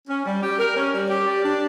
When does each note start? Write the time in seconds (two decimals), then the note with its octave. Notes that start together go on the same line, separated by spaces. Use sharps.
0.08 C#4
0.26 G3
0.42 G4
0.59 A#4
0.76 C#4
0.93 G3
1.10 G4
1.27 D5
1.44 D4